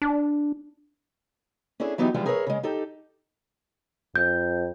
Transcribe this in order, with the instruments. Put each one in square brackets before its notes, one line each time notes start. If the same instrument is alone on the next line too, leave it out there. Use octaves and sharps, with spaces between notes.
[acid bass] D4
[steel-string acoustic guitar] C#4 D4 E4 G#4 A4
E3 F#3 B3 D#4 E4 G4
E3 F3 G3 G#3 F4
G#4 A#4 B4 C#5 D5 E5
C#3 G#3
D#4 G4 A4
[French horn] F2 [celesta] G6